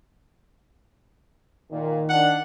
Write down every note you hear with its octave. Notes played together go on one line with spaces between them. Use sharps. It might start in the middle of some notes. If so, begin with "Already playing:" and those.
A#2 D#3
D4 F#5